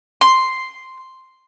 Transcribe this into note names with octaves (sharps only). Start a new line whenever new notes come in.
C6